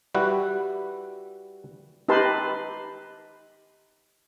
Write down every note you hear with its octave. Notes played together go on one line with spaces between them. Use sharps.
G3 E4 F#4 B4
D#4 G4 B4 A5 C6